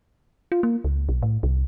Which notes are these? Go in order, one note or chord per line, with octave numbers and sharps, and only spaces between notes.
F4
A#3
C#2
B1
A2
C2